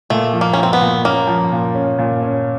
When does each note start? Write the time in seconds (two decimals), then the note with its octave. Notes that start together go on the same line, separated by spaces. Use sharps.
0.10 A#2 A3
0.33 F3
0.41 A#3
0.53 F3 C#4
0.63 C4
0.73 B3
0.81 A#2
1.04 A#3 C#4
1.27 F3
1.52 A#2
1.75 C#4
1.98 A#2
2.22 C#4